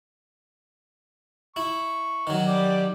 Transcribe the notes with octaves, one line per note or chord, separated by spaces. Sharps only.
E4 C#6
D#3 F#3
G4 D5